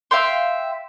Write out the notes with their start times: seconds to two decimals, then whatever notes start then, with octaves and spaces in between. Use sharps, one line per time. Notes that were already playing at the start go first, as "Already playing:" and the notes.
0.11 E5 F5 G5 C6